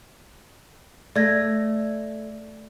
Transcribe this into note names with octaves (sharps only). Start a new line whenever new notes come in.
A3 D5 G#6 A#6